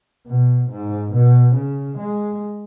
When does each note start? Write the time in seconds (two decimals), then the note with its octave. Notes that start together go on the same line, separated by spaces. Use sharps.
0.27 B2
0.70 G#2
1.13 B2
1.56 C#3
1.98 G#3